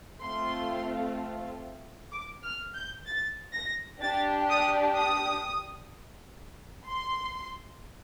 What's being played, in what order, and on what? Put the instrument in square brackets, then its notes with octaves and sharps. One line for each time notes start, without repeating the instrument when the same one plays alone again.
[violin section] A3 C4 F4 C6
D6
F6
G6
A6
A#6
D4 G4 A6
D#6
D#6
C6